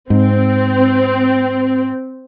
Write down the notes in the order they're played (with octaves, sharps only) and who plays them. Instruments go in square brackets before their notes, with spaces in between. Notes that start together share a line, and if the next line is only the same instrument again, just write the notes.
[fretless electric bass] G#2 [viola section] C4